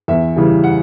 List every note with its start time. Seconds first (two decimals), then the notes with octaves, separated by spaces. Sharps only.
0.08 E2 E5
0.36 C#3 E3 G3
0.64 F#5